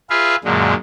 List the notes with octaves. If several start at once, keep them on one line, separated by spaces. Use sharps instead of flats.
F4 G#4 B4 E5 F5
F#2 A#2 D3 G#3